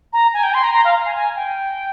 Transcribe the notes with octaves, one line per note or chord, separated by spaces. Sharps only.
A#5
G#5
G5
C6
A#5
A#5
F5
G#5
G#5
G5